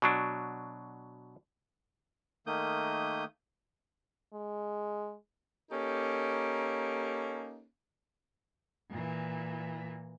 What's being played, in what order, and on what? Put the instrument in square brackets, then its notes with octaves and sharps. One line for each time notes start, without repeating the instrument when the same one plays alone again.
[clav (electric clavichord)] B2 F#3 D4
[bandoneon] D#3 A3 A#3 D#6 G6
[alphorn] G#3
[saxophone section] A#3 C#4 D#4 G4 A4
[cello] A#2 E3